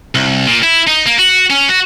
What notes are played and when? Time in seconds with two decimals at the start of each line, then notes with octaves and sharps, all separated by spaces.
0.15 C2
0.47 A#2
0.63 E4
0.87 D#4
1.06 A#3
1.18 F#4
1.50 C#4
1.68 F#4